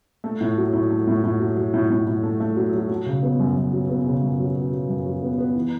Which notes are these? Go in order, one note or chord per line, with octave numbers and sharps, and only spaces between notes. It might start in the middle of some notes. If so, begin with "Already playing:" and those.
A3
A2
F#3
A2
A3
A2
A2
F#3
F#3
A2
A2
A2
A3
A3
F#3
F#3
F#3
C#3
B3
F#2
F#2
F#3
B3
C#3
F#2
F#3
F#3
F#3
F#2
F#3
B3
B3
E3